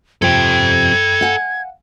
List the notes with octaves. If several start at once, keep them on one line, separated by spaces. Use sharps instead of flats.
F2 C3 F3 A4 G5 G#6
F5 F#5 G#5